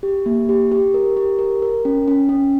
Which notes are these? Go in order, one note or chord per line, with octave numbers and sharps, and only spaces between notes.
G4
A#3
G4
G4
A#4
G4
A#4
A#4
C#4
C#4
C#4